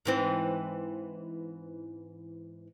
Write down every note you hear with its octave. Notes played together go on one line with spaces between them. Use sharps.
G#2 E3 C4